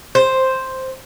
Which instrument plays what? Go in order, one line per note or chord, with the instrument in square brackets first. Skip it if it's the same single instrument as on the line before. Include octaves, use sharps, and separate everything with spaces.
[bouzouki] C5